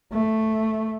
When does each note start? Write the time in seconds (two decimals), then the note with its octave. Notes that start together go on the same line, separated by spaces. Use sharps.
0.12 A3